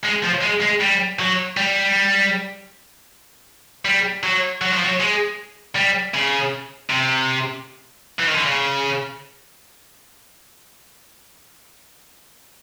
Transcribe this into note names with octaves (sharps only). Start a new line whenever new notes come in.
G#3
F3
G#3
G#3
G3
F#3
G3
G3
F#3
F#3
F3
F#3
G#3
G3
C#3
C3
E3
D#3
D3
C#3